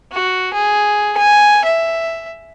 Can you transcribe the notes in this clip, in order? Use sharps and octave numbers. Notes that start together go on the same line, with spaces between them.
F#4
G#4
G#5
E5